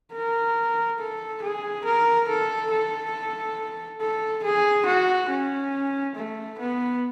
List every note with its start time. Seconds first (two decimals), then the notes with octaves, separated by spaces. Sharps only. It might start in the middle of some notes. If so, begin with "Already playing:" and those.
0.13 A#4
0.99 A4
1.43 G#4
1.85 A#4
2.28 A4
2.71 A4
4.01 A4
4.44 G#4
4.86 F#4
5.30 C#4
6.16 A3
6.59 B3